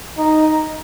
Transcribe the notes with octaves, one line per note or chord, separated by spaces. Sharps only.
D#4